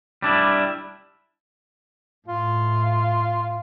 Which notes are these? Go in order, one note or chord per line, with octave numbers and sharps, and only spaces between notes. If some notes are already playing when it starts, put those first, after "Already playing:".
G3 D4 E4
A2 F4